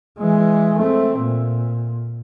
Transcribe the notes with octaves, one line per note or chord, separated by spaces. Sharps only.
E3 G#3
A3 C4
A#2